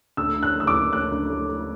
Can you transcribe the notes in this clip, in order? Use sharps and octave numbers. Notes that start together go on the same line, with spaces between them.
D2 E6
D3
F#6
A3
E6
D6
D2
D2 F#6
D2
A3
A3